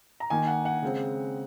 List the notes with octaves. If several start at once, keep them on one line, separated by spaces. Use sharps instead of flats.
A#5
D#3 A#3 G#5
F#5
F#5
C#3 G#3 C4